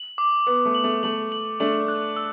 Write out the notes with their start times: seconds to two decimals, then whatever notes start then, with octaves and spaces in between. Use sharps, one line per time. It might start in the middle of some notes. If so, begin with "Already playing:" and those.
Already playing: F#7
0.18 D6
0.47 B3 D6
0.65 A3
0.75 F#7
0.84 A3
1.03 A3 F#7
1.32 F#7
1.60 A3 D4 F#7
1.88 F#6
2.16 E6